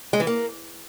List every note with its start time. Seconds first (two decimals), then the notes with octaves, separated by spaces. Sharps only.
0.13 G#3
0.20 E3
0.27 A#3